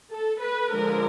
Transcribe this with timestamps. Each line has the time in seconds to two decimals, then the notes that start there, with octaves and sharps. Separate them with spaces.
0.10 A4
0.41 B4
0.72 D3 F3 G#3 A#4